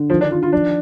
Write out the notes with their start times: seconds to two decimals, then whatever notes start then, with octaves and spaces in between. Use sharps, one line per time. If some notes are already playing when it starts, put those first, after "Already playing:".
Already playing: D3
0.10 D#3 F3
0.21 D4
0.31 D#3 F4
0.43 F4
0.52 F3 D4